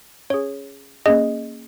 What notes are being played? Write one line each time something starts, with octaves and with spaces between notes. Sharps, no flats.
C#4 G#4 C#5
A#3 C#4 G#4 D#5